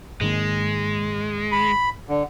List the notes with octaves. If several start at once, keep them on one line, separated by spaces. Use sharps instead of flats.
G#2 D#3 G#3 A#3
B5
D3